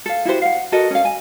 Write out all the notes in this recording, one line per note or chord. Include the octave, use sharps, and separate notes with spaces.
A4 F5
E4 F#4 G4 C5
F5 F#5
F#4 A4 A#4 D#5
C#4 F5
G#5